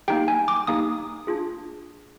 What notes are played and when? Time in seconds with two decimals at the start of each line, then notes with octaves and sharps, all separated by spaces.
0.08 A#3 D#4 G4 G5
0.28 G#5
0.48 D6
0.67 A#3 D#4 G4 D#6
1.27 D4 F4 G#4